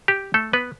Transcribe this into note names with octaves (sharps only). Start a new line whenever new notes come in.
G4
A3 A4
B3 B4